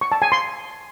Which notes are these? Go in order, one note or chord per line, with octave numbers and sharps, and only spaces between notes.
C#6
A5
G#5
C6